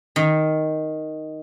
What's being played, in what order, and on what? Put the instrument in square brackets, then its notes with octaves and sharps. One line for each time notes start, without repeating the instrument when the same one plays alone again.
[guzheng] D#3